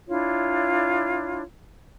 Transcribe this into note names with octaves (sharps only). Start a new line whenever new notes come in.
D4 E4 F4 C#5